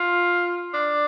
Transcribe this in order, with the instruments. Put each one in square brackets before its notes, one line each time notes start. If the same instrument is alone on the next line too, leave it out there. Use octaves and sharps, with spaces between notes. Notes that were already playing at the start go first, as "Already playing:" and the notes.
Already playing: [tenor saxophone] F4
D4